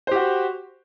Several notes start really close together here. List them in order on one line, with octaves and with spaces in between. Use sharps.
C5 G4 F#4